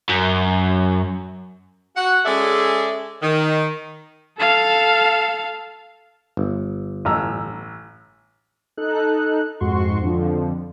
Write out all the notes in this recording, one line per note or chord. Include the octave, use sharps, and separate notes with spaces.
F#2
F#4 F#5
G#3 C#4 G#4 A4 D5 E5
D#3
A4 F5
G1
A1 A#5 E6
D#4 A4 F#6
F2 G#2 F#4 C6 C#6
F2 D3 F3